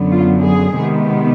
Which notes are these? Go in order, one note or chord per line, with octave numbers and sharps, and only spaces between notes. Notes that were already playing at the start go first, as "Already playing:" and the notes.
Already playing: F#2 D3 F#3 B3
F4
G#4
C3 D#3 G#3 B3